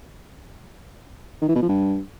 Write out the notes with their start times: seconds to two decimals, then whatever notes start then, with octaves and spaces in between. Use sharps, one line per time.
1.42 D#3
1.49 E3
1.55 B2
1.62 F3
1.69 G2